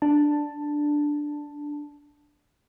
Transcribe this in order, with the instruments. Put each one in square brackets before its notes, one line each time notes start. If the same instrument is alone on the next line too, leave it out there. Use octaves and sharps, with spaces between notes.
[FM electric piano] D4 A5